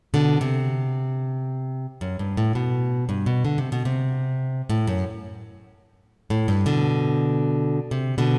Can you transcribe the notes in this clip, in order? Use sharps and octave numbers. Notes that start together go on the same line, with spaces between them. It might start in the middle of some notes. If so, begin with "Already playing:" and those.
B2 D3
C3
F#2
G2
A2
B2
G2
B2
D3
C3
B2
C3
A2
F#2
A2
G2
B2 D3
C3
B2 D3